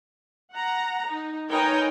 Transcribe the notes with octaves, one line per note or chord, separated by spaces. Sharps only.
F#5 A#5
D#4
D#4 A#4 B4 C#5 G5 G#5